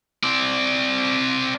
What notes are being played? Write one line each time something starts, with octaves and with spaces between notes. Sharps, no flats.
C4 D5